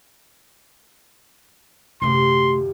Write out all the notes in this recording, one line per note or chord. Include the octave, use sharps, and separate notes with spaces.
D#1 F#2 C3 A3 G4 C6